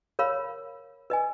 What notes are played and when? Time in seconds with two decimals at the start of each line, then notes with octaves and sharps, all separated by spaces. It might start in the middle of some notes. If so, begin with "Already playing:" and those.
0.19 A#4 C#5 F5 B5
1.10 B4 D#5 G#5